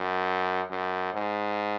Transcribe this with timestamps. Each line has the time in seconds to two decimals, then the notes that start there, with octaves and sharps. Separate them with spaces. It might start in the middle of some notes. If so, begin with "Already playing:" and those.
Already playing: F#2
0.70 F#2
1.14 G#2